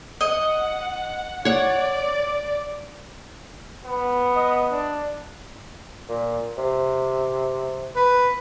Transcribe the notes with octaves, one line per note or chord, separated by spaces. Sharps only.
D#5 F#5
C#5 D5 F#5
B3
D#5
D4
A#2
C3
B4